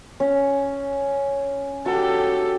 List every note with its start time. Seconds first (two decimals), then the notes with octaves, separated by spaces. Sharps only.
0.20 C#4
1.86 F#4 G4 A4